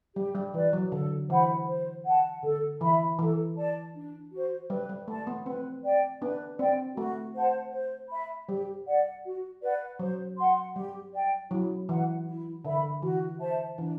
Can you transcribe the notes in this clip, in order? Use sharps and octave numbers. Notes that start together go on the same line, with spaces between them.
G3 G4
G3
E3 B4 D5
F#3
D3 A4
E3 C5 F#5 B5
C5
F#5 A5
D3 A4
E3 E5 B5
E3 A4
D5 A5
D4
F#4 C5
G3 B4
G3
A3 D5 A5
B3
C4 B4
D5 G5
B3 D4 B4
C4 D5 G5
A3 F#4
C5 F#5 A5
C5
E5 B5
G3 G4
D5 F#5
F#4
B4 D5 F#5
F#3 C5
F#5 C6
G3 G4
D5 G5
F#3 E4
E3 B4 F#5
E4
D3 A4 E5 B5
E3 F#4
C5 E5 A5
E3 D4